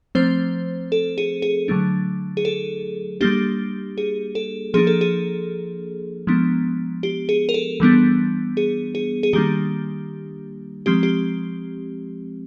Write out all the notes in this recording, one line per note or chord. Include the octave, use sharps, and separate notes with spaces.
F3 A3 C4 C5
A4
G#4
G#4
D3 F#3 A3 D4
G#4
A4
G3 A#3 D4 G4
G#4
A4
F3 A#3 D4 G#4
A4
G#4
F3 G#3 B3 D4
G4
G#4
A#4
A4
E3 G3 B3 D4
G#4
G#4
G#4
D#3 G3 A#3 D4 G4
F3 G#3 C4 G4
G4